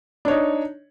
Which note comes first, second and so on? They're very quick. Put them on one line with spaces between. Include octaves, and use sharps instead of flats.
D4 C#5 D#4